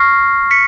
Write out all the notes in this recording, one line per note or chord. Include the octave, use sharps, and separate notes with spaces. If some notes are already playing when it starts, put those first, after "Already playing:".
Already playing: C#6 F6 A#6 C7
B6 C#7